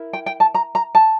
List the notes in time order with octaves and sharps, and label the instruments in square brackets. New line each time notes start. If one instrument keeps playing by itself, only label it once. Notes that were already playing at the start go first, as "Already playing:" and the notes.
Already playing: [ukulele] E4 A#4
G5
G5
A5
A#5
A#5
A5